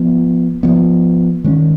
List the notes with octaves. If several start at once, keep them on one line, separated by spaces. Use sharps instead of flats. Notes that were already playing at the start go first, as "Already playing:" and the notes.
Already playing: F3 B3
F3 B3
D#3 G#3 C#4